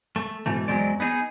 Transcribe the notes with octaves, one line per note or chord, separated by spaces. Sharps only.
A3
G#2 B2 E3 A3
E2 F#3 G#3 C4 D5
B3 D#4 G#4